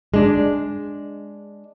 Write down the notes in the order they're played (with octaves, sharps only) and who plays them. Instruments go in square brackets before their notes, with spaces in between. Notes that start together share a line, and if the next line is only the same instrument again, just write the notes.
[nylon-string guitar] G#3 D4